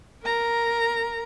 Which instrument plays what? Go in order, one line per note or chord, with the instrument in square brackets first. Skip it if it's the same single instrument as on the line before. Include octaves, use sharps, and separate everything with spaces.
[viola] A#4 A#5